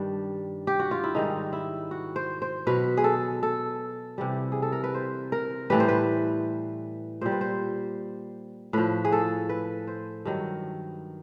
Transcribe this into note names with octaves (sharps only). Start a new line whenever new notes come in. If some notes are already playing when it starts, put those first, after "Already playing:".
Already playing: G2 D#3 G3 D4
G4
F#4
F4
E4
G#2 D#3 G3 D#4
E4
F#4
C5
C5
B2 F#3 B4
G#4
A4
A4
C3 E3 G3
G#4
A4
A#4
B4
C5
A#4
A2 E3 G3 B4
C5
B4
A#2 G3 C5
B4
C5
A2 F3 B4
G#4
A4
B4
C5
G2 D#3 F#3